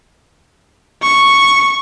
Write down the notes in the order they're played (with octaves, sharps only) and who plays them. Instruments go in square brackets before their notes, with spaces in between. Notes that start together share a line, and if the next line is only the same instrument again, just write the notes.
[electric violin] C#6